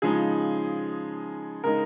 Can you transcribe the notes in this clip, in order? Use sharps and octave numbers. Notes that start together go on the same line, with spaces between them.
C#3 F3 G#3 D#4 G#4
C#3 G#3 D#4 A#4